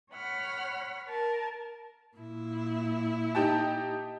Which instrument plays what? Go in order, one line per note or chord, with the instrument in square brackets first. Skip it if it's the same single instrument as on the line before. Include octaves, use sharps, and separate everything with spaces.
[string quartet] C#5 F#5 B5 F6
A#4 A5
[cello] A#2 E4
[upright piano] D#4 G4 A5